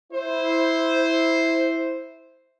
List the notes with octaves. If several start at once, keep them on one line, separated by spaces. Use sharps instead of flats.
E4 C5